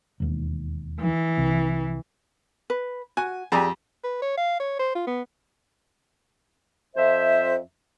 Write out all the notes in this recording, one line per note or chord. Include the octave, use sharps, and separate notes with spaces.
E1 D#2
E3
C2
B4
F#4 G#5
F2 G4 G#4 D5 G#5 A#5
B4
C#5
F5
C#5
C5
F4
B3
F2 C5 E5